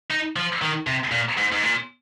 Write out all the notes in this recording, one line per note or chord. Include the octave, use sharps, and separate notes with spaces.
D#4
F3
D#3
C3
A#2
G#2
G#2
A#2